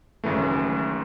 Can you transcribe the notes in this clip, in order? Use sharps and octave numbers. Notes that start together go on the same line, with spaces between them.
G#1 F#2 C#3 E3 A3